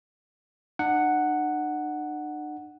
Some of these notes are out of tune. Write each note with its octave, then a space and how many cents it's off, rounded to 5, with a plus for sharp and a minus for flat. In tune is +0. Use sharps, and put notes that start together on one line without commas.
D4 +45 F#5 +0